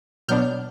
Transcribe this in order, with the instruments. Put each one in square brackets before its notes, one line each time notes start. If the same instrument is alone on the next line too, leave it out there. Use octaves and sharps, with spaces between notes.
[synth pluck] B2 F#3 B3 D4 F6 G6